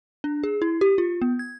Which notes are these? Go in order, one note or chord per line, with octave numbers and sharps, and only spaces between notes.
D4
G#4
E4
G4
F4
B3
G#6